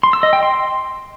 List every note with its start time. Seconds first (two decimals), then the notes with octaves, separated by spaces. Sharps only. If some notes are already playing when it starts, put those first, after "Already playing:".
0.03 C6
0.13 E6
0.23 D#5
0.33 G5
0.43 C6